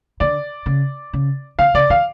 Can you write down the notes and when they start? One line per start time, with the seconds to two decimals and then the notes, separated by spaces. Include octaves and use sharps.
0.20 D3 D5
0.66 C#3
1.13 C#3
1.59 D3 F5
1.74 C#3 D5
1.90 D3 F5